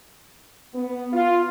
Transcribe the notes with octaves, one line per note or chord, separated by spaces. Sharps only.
B3
F4